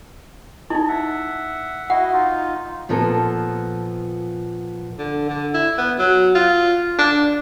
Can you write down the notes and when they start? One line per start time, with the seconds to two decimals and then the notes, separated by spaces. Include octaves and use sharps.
0.70 D#4 E4 D#5 G#5
0.88 E5 F#5
1.90 E4 F#4 D#5 F#5
2.13 D#4 F4
2.89 A#2 F3 B3 A4 A#4
4.98 D3
5.29 D3
5.54 E4
5.78 B3
5.99 F#3
6.35 F4
6.98 D4